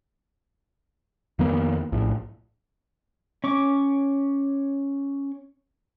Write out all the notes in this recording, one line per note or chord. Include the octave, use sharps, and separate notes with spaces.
F2 D#3 A#3 B3
A#1 A2
C#4 C#6 D6